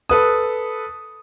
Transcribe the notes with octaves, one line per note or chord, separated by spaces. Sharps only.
A4 B4 D#6